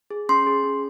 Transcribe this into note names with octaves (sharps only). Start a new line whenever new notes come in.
G#4
C#4 C6
G#4
C#4